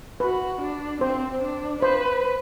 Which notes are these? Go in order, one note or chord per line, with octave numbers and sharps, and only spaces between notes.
F#4 B4
D4
C4 C5
D4
B4 C5